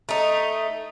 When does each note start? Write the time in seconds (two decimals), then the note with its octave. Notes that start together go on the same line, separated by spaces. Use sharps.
0.09 A3 D#4